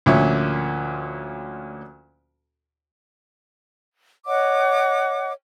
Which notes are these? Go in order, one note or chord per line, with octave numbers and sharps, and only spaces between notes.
D2 A#2 F3 C#4 E5
C#5 D#5 F#5 D6